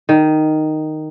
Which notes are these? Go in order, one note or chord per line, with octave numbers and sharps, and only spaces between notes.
D#3